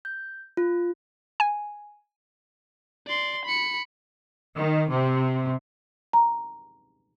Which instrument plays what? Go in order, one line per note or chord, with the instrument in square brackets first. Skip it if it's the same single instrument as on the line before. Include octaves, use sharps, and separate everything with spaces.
[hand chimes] G6
F4
[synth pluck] G#5
[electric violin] D5 C6
B5 C#7
[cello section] D#3
C3
[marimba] A#5